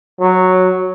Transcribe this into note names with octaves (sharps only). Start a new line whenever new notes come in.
F#3